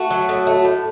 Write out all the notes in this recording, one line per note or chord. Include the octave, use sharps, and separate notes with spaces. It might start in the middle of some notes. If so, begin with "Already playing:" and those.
Already playing: A3 F#4
F#3
A2
A3
A2